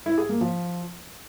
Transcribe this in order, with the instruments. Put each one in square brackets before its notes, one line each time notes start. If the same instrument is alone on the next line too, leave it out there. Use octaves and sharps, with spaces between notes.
[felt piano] E4
G#4
A#3
F3